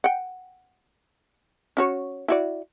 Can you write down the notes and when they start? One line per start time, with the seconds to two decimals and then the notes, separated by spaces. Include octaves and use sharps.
0.04 F#5 G5
1.77 C#4 F#4 C#5
2.28 E4 F#4 D5